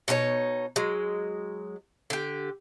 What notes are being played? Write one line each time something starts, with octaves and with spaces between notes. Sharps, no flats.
B2 D#4 G4 C#5
F#3 G#3
D3 G4